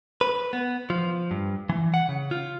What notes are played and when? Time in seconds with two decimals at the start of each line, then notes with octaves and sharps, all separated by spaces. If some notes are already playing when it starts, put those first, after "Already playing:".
0.21 B4
0.53 B3
0.90 F3
1.31 G2
1.69 E3
1.94 F#5
2.09 C#3
2.31 F4